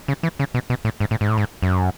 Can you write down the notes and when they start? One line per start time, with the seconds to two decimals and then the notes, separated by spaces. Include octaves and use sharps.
0.08 C#3
0.23 E3
0.39 C#3
0.54 B2
0.70 B2
0.85 A2
1.00 G#2
1.11 A2
1.21 G#2
1.29 A2
1.38 G#2
1.63 F#2